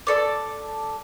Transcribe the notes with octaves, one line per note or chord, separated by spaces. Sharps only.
A4 D5